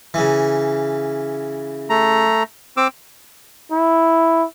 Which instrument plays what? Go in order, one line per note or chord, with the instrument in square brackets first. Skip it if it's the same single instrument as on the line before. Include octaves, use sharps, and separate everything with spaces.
[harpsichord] C#3 E3
[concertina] A3 A#5
C4 D6 E6
[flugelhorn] E4